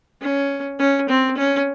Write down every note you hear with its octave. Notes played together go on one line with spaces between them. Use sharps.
C#4
C#4
C4
C#4